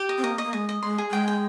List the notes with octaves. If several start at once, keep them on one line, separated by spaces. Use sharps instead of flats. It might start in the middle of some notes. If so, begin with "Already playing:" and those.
Already playing: G4
D#5
C4
A#3 D#5
D#5
A#3
G#3 D#5
D#5
G#3 C6
G#4
G#3 G5
G5